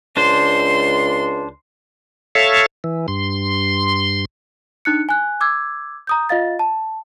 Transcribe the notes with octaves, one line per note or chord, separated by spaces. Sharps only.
C#2 D4 C5 C6
A4 C#5 E5 F5
E3
G2 C6
D4 D#4 F#6 C#7
G#5 F#6
D6 E6 G#6
A#5 D#6 G6
F4 D#5 F5 A6
A5